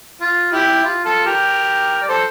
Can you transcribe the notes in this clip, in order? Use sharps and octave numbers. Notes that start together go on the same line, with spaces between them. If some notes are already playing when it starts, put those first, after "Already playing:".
F4
E4 G4
F4
F4 A4
G4 A#4
D5
A4 C5